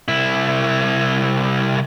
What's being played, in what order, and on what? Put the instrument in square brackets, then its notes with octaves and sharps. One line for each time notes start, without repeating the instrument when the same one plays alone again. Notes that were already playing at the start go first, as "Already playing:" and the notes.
[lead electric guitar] C2 E4